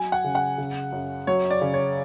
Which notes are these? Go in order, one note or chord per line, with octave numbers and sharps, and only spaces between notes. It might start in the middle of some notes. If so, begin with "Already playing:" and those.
Already playing: F#3 G#5
F#5
C#3
F#5
C#3
F#2
F#3 C#5
D5
C#3
C#5